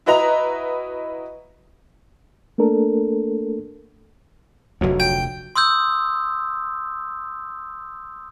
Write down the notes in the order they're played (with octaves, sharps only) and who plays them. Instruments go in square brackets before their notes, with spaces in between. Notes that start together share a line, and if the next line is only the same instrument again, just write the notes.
[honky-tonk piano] E4 F#4 B4 D#5 A#5 F7
[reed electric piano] A3 A#3 D4 A4 A#4
[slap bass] F1 D2 [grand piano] F#3
[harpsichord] G5
[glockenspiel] C6 D#6 E6 G6